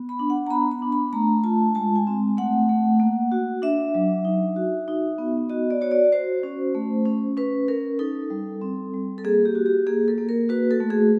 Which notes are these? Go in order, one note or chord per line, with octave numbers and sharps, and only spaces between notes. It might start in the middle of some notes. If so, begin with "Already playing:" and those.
Already playing: B3
B5
D4
F#5
A#5
B3 B5
B5
D4
B5
A3 A#5
F4 A5
G#3 A5
G#5
C4
A3 F#5
A3
A#3
F#4
D4 E5
F#3
D#4
F#4
D#4
B3
F#4 D#5
D5
F#4 C#5
D5
F#4 C5
C#4
A3
C#4
C#4 B4
C#4 A#4
D#4 A4
G3
C4
G3
A4
A#3 G#4
G4
F#4
G4
A#3 G#4
A4
A#3
A#4
F#4 B4
A4
A3
G#4